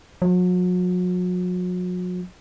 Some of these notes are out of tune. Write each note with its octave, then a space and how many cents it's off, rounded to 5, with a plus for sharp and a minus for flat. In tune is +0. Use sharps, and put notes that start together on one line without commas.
F#3 -40